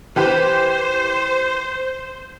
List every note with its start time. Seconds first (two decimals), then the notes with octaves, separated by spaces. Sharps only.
0.16 E3 G4 B4 C5